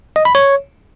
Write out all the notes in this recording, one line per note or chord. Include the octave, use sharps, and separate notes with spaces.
D#5
B5
C#5